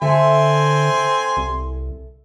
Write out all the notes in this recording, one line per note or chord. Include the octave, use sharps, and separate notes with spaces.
D3 C4 A4 E5 G#5 C6
C2